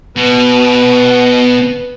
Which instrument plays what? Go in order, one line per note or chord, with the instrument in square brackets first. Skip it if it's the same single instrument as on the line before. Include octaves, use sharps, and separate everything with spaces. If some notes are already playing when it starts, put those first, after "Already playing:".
[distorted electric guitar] B2 [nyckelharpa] B4